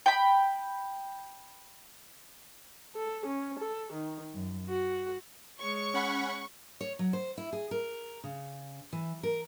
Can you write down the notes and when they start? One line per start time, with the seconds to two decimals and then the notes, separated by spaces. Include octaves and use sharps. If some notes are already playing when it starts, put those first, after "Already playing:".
0.06 G5 B5
2.96 A4
3.26 C#4
3.59 A4
3.93 D#3
4.34 F#2
4.69 F#4
5.59 G#3 C#5 C#6
5.94 C#4 F#5 B5
6.81 C#5
6.99 F#3
7.13 C5
7.38 E4
7.53 G#4
7.71 A#4
8.24 C#3
8.93 E3
9.23 A#4